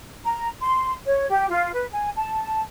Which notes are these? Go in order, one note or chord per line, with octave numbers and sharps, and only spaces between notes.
A#5
C6
C#5
G4
F4
B4
G#5
A5